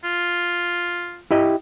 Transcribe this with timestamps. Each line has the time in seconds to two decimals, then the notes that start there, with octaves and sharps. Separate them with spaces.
0.04 F4
1.31 E4 G4 D#5